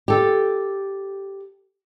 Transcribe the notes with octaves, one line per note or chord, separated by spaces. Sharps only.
G4 A4